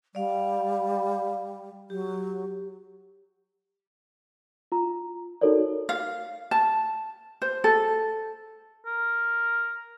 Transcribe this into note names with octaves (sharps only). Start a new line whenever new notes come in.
G3 D5 F5
F#3 G4
F4 A#5
D#4 F#4 A4 A#4 C#5 D5
F5
A5
C5
A4
A#4